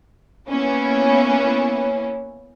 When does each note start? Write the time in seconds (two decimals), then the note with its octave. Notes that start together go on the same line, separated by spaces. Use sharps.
0.48 A#3 B3 C#4 E4